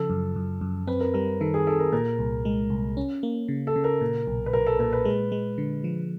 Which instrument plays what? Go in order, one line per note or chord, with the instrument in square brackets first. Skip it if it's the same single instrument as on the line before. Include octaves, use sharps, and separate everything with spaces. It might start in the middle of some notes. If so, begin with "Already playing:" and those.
Already playing: [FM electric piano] C#3 F3 [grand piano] A4
[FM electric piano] F#2
F#2
F#2
[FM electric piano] C4 [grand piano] B4
[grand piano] A#4
[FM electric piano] G3 [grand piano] A#4
[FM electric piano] D#3 [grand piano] A4
[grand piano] G#4
[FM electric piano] D#3 [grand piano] A4
[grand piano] A#4
[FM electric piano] A#2 [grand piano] A#4
[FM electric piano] C2
G#3
C2
C#4
A#3
C#3
[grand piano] A4
[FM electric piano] C#3
[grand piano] A#4
[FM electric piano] A#2
B1
[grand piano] B4
[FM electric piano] B1 [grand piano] A#4
[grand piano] A4
[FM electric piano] A#2 [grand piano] A#4
[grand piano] B4
[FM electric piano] G#3
G#3
D3
F3